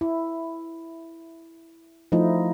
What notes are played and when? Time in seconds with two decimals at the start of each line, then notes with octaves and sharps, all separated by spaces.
0.01 E4
2.12 F3 A3 D#4 E4